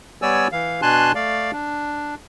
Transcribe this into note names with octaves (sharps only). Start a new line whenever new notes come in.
G3 B3 C#5 D5 G#5 E6
E3 F5
B2 D4 G#5 A5 C6 F#6
A3 D5 F5
D4